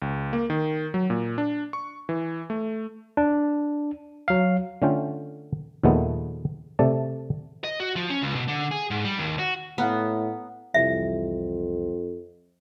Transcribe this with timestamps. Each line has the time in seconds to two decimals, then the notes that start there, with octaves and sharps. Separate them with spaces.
0.02 C#2
0.33 A#3
0.50 D#3
0.94 F#3
1.10 A#2
1.38 D4
1.73 C#6
2.09 E3
2.50 A3
3.17 D4
4.28 F#3 F5
4.82 D3 A3 C#4 F4 G5
5.83 D#2 A#2 F3 G#3 A3 B3
6.79 C3 A3 D5 A5
7.64 D#5
7.80 F#4
7.96 F3
8.10 C#4
8.22 C#2
8.35 B2
8.48 D3
8.71 G#4
8.91 G#2
9.05 G3
9.19 D#2
9.39 F#4
9.78 A2 B3 F5 F#5 A#5
10.74 C2 F2 E3 G3 E5